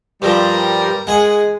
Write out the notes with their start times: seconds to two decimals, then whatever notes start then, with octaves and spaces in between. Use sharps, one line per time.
0.22 G2 F3 G3 A#4
1.07 G#3 G#4 F#5